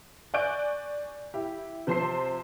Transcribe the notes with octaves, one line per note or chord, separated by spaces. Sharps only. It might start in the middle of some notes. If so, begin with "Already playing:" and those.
D5 G#5 C#6 F#6 G6 D7
E4 G4
C3 F3 C5 A5 C6 C7